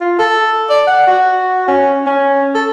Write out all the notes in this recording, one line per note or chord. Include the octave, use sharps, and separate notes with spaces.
F4
A4
D5
F#5
F#4
C#4
C#4
A4